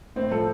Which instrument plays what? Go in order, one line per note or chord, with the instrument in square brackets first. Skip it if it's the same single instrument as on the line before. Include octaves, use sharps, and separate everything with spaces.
[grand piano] A2 C4
F3 A4